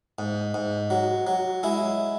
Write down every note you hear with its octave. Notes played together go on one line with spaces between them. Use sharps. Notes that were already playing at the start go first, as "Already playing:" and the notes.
G#2
G#2
F#3
F#3
G#3 E4